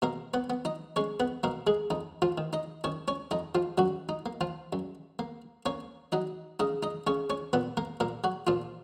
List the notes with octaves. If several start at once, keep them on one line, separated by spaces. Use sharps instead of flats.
B2 A#3 A#4
B3 B4
B3
D#4 D#5
G#3 C#4 C#5
B3 B4
B2 A#3 A#4
G#3 G#4
F2 D#4
F3 F4
D#3
D#4 D#5
D#3 C#4 C#5
C#4 C#5
F2 D#4 D#5
F3 F4
F#2 F#3 F#4
D#4
A#3
F3 F4
F#2
A#3
A#3 C#4 C#5
F#3 D#4 D#5
C#3 D#4 D#5
D#4 D#5
C#3 C#4 C#5
C#4 C#5
A#2 B3 B4
A#3 A#4
A#2 A#3 A#4
F#3 F#4
A#2 F3 F4